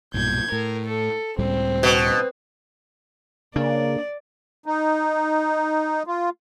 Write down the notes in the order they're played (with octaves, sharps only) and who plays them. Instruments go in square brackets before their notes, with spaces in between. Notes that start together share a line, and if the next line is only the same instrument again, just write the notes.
[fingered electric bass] B1 G2 A#2 [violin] G6 G#6
[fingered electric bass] A2 [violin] A#4
[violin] A4
[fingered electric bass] C#2 A2 G3 [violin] C4
[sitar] B2
[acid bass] C#3 [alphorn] A#3 [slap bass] D4 [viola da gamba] D5
[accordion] D#4
F4